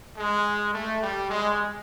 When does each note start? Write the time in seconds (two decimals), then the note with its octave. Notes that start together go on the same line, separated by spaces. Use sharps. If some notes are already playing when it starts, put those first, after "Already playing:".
0.17 G#3
0.74 A3
1.02 G3
1.30 G#3